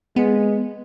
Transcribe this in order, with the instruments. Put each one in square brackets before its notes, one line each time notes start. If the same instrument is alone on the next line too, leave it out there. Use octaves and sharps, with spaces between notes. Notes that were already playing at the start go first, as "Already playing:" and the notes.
[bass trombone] G#3 [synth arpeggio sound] B3